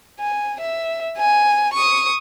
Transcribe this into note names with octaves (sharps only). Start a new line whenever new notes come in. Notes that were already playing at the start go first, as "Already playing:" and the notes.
G#5
E5
G#5
C#6 D#6